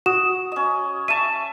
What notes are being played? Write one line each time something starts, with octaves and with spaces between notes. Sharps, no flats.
F#4 D#6 E7
C#4 D#5
E5 A5 C#6 D#7 E7